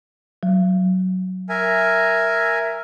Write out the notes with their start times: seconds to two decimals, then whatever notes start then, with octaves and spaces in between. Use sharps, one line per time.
0.43 F#3
1.49 A#4 E5 G#5